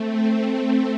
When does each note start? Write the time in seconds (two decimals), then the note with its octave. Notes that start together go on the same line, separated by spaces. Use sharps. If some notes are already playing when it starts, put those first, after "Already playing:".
Already playing: A3 C4